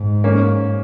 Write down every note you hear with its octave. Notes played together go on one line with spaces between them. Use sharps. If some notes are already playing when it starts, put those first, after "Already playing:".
Already playing: G#2
A#3 C#4